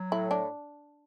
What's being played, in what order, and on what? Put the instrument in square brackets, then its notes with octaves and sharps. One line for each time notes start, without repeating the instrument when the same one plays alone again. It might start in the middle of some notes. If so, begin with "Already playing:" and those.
Already playing: [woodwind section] F#3
[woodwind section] A2 [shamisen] E4
[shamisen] D4